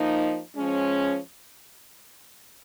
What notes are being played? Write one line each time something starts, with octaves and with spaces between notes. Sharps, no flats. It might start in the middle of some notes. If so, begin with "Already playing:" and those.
Already playing: F3 A#3 D#4
F3 G#3 C#4